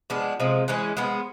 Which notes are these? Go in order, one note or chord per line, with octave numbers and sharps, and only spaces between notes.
F3 G#3 B3 D4
C3 F3 G#3
E3 G#3 C#4
F3 G#3 B3